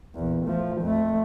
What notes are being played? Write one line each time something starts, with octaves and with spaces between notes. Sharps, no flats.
A#1 E2
F3 A3
F2 A3